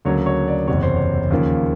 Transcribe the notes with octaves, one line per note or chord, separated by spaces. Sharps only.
D2 C#3 F#3 A#3 C#5
C#5
D5
F#1 E2 C3 C#5
C5
C#5
D#2 C#3 F3 A#3